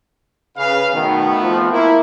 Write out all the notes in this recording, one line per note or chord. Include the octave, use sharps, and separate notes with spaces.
C#3 B4 F5
B2 D#3 A3 B3
F2 F3
A#3 E4